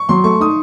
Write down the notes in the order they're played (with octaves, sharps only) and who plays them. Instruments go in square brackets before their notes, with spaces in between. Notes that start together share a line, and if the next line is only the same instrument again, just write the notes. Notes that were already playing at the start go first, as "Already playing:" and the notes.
Already playing: [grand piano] C#6
[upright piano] F#3 [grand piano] C6
[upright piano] A3 [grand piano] C#6
[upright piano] D#4 [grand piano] D#6